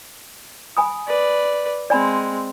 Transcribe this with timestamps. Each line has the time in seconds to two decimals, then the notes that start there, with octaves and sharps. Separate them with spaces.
0.77 G#5 B5 D#6
1.08 B4 D5
1.90 G#3 C4 D5 G#5 B5